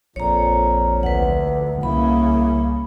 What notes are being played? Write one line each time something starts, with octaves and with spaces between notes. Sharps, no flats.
A#1 F2 A#2 C#5 A#5
D2 B4 F#5
C2 C#3 A#3 E4 B5